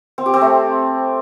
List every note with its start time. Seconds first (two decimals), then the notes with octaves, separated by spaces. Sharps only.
0.18 C4
0.26 G4
0.34 C4
0.41 A3